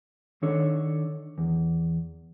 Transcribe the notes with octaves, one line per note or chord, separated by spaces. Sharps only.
D#3 D4 A4 C#5
E2